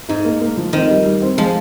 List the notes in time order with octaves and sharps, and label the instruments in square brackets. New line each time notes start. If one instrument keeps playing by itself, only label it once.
[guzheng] G#2 [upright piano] D#4
[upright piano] A#3
A#3
F3
[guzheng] D#3 [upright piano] C4
[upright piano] G3
G3
C4
[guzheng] F3 [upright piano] G#3